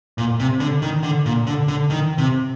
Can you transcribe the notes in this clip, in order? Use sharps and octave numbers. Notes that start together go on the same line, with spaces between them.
A#2
C3
D3
D#3
D3
A#2
D3
D3
D#3
C3